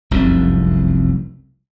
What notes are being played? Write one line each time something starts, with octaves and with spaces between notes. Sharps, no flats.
F1 C2 F#2